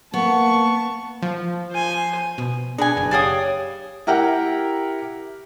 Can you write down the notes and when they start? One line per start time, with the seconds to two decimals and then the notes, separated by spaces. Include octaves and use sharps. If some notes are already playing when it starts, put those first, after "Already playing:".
0.14 A#3 B3 A5 C#6
1.22 F3
1.71 C5 G#5
2.38 B2
2.78 D4 G#4 B4 G#5
2.97 F#1
3.11 G4 C#5 D5 F5 G5 D#6
4.07 E4 G4 A#4 F#5 G5